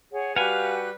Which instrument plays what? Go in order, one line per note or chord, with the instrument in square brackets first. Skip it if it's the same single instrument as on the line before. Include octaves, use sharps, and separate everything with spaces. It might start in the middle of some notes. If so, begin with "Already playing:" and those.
[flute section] G#4 C#5 F#5
[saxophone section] G3 B4 [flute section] F#4 G4 F#6 [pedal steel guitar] F5 [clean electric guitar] F#5 G#5